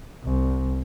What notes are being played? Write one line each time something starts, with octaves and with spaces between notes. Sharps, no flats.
C2